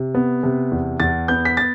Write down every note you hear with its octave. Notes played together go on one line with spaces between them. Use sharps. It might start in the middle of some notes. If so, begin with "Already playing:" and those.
Already playing: C3
B3
C3
E2
E2 A6
B3 G6
B6
A6